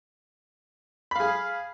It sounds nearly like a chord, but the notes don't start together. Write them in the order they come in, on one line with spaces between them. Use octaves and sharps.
B5 F5 G#4